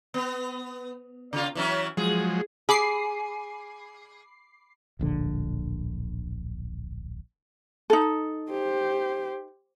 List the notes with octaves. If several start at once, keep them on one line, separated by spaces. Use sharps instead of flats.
B3
C#3 F4
E3 F#3 C#4
F3 F#3 G#3 G#4
G#4 B5 D6 C7
D1 A#1 D3
D#4 A4
G4 C5